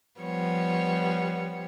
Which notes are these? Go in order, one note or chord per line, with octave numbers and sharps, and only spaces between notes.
F3 G3 B3 C#5